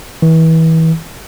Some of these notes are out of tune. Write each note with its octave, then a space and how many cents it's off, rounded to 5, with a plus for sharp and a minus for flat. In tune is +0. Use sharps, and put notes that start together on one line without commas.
E3 -30